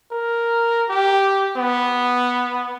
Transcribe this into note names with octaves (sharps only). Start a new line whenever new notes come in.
A#4
G4
B3